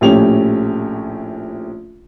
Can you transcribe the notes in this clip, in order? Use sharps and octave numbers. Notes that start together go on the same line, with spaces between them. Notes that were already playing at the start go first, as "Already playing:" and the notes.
A#1 A2 A3 C#4 G4 F7